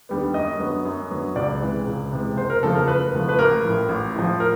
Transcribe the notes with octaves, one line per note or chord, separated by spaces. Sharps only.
D#2 D3 G3 B3
F#2 D#5
D3 F#3 B3
F#2
D3 F#3 B3
C#2 D5
C3 E3 G#3
C#2
C3 E3 G#3
F#1 C5
A#4
E2 C#3 F3 A3 A4
A#4
F#1 B4
E2 C#3 F3 A3
B4
A1 A#4
A2 F3
A1
A2 F3
A#4